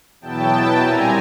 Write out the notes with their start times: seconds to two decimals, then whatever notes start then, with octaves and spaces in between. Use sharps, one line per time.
0.21 E2 B2 F#3 B3 E4 G5 A5
0.51 G5 A5
0.81 A#2 G3 C4 E4 G#5 A#5